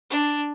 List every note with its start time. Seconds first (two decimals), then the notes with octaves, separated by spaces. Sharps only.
0.10 D4